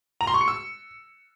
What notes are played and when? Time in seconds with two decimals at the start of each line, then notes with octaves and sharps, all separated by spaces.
0.21 A#5
0.27 C6
0.34 C#6
0.41 C#7
0.48 E6